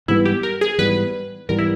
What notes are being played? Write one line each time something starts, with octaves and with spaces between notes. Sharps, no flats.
G#2 E3 G3 B3 E4
G4
A#4
G#4
G#2 E3 G3 B3 B4
G#2 E3 G3 B3 A#4
E4